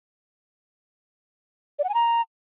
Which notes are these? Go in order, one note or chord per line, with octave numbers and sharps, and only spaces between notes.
D5
F#5
G#5
A#5